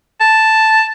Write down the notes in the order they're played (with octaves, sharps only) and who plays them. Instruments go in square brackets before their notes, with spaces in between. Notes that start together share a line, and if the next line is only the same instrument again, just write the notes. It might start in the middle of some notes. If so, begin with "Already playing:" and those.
[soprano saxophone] A5